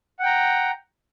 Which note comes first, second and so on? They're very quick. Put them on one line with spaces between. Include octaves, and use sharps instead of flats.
F#5 G5 A#5